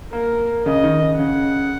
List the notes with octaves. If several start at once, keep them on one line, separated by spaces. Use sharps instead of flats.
A#3 A#4
C#3 D#5
D#3
C#3
C#3 F#5